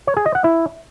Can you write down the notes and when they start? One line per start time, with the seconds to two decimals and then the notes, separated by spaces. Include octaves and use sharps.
0.07 C#5
0.17 G#4
0.26 D#5
0.35 F#5
0.44 E4